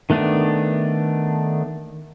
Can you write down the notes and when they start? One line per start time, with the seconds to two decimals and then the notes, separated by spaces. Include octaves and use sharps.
0.10 D#3 A3 B3 D4